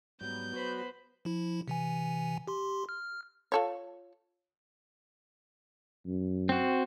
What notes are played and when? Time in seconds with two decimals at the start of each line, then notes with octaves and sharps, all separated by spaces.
0.21 G#2 F#3 G3 B3 G6
0.53 F#3 F#4 B4 C5 B5
1.25 F3 E4
1.68 C3 E3 G#5
2.48 G4 C6
2.89 F6
3.52 F4 A4 C#5
6.06 F#2
6.49 C4 F#4